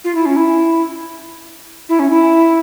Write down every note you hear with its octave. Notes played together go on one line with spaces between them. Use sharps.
F4
E4
C#4
E4
E4
C#4
E4